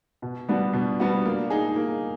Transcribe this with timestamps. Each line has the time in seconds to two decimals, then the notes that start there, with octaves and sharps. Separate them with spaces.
0.22 B2
0.49 G3 B3 D4 F#4
0.73 B2
1.00 G3 B3 D4 F#4
1.25 A#3
1.50 D#4 G#4
1.76 A#3